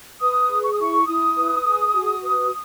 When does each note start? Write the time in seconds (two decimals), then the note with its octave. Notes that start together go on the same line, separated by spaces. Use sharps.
0.20 B4 D#6
0.49 G#4
0.64 C#6
0.72 D#6
0.78 E4 C#6
1.07 E4 D#6
1.36 B4
1.65 G#4
1.94 F#4
2.23 B4